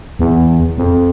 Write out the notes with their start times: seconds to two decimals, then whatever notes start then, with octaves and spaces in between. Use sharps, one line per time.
0.19 E2
0.77 F2